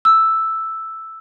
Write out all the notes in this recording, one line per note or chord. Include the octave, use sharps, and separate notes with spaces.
E6